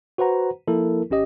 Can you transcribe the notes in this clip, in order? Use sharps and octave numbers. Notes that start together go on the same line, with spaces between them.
F#4 B4 C5 F#5 A#5
F3 A#3 E4 A4 A#4
G#1 C#4 G4 D#5